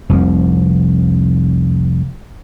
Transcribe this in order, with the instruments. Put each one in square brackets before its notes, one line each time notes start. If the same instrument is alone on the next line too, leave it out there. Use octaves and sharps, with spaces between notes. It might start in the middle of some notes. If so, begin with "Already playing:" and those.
[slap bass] F1 C2 F2 F3